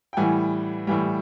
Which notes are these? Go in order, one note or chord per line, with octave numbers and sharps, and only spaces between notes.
G5
A2 E3 G3 F#5 G#5
A2 E3 G3